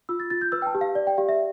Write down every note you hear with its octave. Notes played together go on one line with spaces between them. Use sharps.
F4 E6
A6
F4 A6
G6
B4 E6
G5
A5
G4
F5
D5
G5
G4 F5
E5